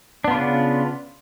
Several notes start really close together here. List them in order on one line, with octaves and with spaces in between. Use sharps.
D4 B3 F4 C#3